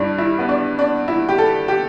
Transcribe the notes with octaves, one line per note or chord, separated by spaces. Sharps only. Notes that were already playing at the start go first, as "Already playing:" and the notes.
Already playing: G2 G3 D4 E4
E4
B3
D4
D4
E4
G4
A4
G4